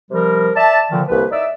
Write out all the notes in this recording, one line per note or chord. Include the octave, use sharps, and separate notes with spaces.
C3 F3 G3 A#4
D5 E5 A5
A#2 D3 D#3 F3
C2 A#3 B4
D#4 D5 E5